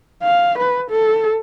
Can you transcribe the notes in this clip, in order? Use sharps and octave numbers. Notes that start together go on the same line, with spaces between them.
F5
B4
A4